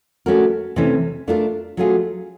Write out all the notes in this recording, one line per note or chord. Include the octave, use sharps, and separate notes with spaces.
A3 C#4 F#4 A#4
C3 E3 A3 C#4
A3 D4 F4 A#4
F#3 A3 C#4 F4 G#4